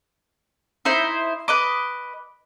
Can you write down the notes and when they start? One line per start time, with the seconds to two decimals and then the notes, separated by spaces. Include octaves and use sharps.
0.85 D#4 E4 C5
1.48 B4 D#5 D6